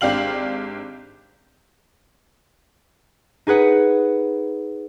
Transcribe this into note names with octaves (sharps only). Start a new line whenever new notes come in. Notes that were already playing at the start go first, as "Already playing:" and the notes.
G#1 D4 G4 F5 F#7
D#4 G#4 B4 F#5